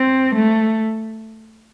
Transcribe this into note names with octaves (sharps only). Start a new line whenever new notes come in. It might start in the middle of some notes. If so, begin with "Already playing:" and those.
Already playing: C4
A3